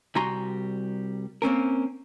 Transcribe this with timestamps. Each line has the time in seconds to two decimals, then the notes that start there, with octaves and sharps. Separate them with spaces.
0.15 C2 G3 F#4 G#5 A#5 C6
1.42 A#3 C4 C#4 A#4